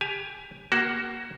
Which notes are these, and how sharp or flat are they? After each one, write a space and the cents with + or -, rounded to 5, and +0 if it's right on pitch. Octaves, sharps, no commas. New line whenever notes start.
G4 +25 G#5 +20
A#3 +15 F#4 +20